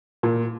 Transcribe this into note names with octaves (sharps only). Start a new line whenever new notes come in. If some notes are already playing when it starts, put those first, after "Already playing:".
A#2